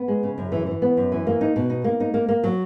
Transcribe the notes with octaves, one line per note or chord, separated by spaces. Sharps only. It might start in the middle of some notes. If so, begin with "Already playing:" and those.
Already playing: B3
G#3
C#3
F#2
E3
E3
B3
F#2
E3
A#3
D#4
B2
D#4
A#3
D#4
A#3
A#3
F#3